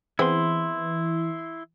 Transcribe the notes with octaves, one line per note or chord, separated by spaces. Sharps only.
E3 B3 C4 E4 G#4 C6